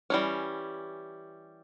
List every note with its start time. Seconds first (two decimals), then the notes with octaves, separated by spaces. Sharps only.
0.10 E3 G3 A#3 C#4